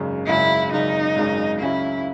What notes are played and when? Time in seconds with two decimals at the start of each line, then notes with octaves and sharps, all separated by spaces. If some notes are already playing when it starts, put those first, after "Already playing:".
Already playing: G#1 F#2 C#3 G#3
0.27 G#1 F#2 C#3 G#3 E4
0.72 G#1 F#2 C#3 G#3 D#4
1.16 G#1 F#2 C#3 G#3
1.60 C#2 C#3 F#3 C#4 E4